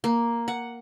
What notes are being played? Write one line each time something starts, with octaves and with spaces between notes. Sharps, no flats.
A#3
F#5